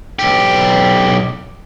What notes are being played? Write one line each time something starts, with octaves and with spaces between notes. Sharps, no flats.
B1 G4